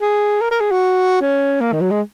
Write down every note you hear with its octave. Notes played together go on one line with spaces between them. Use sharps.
G#4
A#4
A#4
G#4
F#4
C#4
A#3
D#3
F#3
G#3